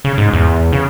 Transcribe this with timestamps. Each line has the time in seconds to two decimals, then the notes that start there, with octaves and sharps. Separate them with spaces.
0.04 C#3
0.18 G#2
0.33 E2
0.72 C#3